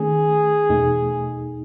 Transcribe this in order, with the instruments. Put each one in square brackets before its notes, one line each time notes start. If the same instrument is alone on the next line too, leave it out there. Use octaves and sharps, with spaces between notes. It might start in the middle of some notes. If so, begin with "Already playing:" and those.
Already playing: [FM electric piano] D#3 A3 C#4 [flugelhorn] G#4
[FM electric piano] E2 B2 A3 D#4